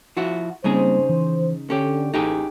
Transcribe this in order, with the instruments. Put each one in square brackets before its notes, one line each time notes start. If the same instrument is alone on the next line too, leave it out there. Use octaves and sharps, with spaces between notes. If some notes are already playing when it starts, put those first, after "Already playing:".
[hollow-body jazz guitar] F3 E4 F#4
[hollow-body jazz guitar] C#3 D#4 G#4 [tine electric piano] G3 A#3 C4 [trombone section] C5
[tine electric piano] E3
[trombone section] D3 [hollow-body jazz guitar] C#4 G4 [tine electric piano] A4
[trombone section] A1 [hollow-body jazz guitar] D#4 G4 G#4